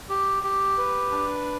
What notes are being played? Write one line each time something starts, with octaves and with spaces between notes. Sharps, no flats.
G4
G4
B4
D4